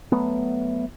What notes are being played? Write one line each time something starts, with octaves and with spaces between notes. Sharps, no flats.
F#3 A3 B3